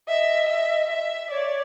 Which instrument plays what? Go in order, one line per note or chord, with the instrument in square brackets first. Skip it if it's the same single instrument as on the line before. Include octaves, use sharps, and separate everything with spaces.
[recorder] D#5 [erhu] E5
[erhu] E5
E5
[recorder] C#5 [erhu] D5